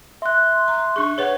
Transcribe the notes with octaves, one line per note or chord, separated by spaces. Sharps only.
E5 C6 F#6
A#5
D4 G#4 C#6
G#4 B4 C#5 F#5